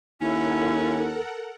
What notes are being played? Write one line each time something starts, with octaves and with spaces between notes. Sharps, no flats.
D#2 C#4 E4 A4 A#4 F#5